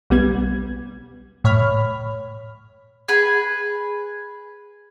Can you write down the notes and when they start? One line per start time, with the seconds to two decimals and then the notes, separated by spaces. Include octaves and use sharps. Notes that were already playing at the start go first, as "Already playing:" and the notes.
0.10 B1 G3 B3 G#6
1.44 A2 C#5 B5 F6
3.08 G#4 B4